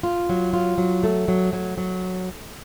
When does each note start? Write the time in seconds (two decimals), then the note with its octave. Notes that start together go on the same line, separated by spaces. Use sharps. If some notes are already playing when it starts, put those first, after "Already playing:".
0.03 F4
0.29 F#3
0.53 F4
0.78 F#3
1.04 A3
1.28 F#3
1.53 F#3
1.78 F#3